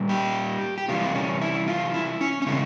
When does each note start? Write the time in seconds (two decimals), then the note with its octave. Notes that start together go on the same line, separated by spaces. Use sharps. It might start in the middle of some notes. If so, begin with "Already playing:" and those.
Already playing: A#2 G3
0.09 G4
0.78 G4
0.88 C3 E3 G3 F4
1.04 C4
1.15 C#4
1.41 E4
1.68 F4
1.94 E4
2.21 C#4
2.42 C#4
2.46 C#3 E3 G#3 C4